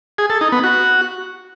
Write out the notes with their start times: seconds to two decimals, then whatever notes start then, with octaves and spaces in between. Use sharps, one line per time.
0.18 G#4
0.30 A4
0.41 D#4
0.52 B3
0.64 F#4